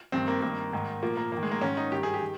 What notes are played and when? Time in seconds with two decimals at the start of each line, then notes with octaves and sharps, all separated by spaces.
0.12 G2 D#3 C4
0.28 A#3
0.42 G2 D#3 A#3
0.73 G#2 D#3
1.03 A#2 F3 A#3
1.17 A#3
1.32 G#2 D#3 A#3
1.43 G#3
1.52 A#3
1.61 G#2 D#3 C#4
1.77 D#4
1.92 G2 D#3 G4
2.03 G#4
2.14 G4
2.21 D#3